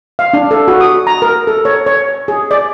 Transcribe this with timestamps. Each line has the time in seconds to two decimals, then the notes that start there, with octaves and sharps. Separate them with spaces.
0.19 F5
0.33 D4
0.51 A4
0.68 F#4
0.81 D#6
1.07 A#5
1.22 A#4
1.47 A4
1.65 C#5
1.86 C#5
2.28 G#4
2.51 D5